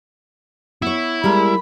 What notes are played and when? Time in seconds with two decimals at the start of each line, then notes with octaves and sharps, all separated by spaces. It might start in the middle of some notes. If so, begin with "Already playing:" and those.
0.82 B3 E4 C#5
1.24 G3 G#3 A#4 B5